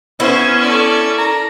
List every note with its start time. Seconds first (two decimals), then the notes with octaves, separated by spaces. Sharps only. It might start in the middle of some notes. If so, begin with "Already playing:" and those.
0.20 B3 C#4 E4 C5 C#6
0.61 A4 D5
1.18 A#5